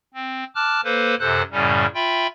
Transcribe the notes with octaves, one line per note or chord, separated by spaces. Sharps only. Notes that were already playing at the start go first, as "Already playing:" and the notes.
C4
A5 D6 F6 F#6
A#3 A4 B4 C5
F#2 C3 A4 C5 F#6
F#2 A2 C#3 G3 C#4
F4 E5 G5 B5